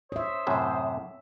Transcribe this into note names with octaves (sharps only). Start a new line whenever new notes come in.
C5 C#5 E5 D#6
F#2 A2 C3